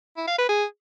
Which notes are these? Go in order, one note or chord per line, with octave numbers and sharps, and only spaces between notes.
E4
F5
B4
G#4